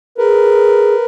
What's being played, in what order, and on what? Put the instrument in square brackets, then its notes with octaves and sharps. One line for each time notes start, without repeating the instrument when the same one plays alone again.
[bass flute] G#4 [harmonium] A#4 B4